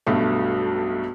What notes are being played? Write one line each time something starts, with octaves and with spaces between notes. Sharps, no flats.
B1 G2 B2 A3